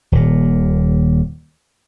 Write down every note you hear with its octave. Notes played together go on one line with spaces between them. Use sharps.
D#1 D#2 A#2